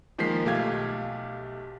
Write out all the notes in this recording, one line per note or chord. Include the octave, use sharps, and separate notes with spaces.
D#3 F3 G#3 A#3 B6 C7
B1 A3 G4 F5 G#6